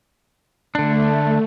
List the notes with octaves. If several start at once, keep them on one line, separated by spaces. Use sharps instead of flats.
D3 A3 D4